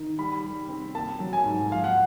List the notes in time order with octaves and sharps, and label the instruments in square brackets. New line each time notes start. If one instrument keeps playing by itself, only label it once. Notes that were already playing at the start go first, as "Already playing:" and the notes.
Already playing: [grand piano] D#3
G3 B5
G3
C4
A#3 A5
F#3
G#5
G#2
F3 F5
F#5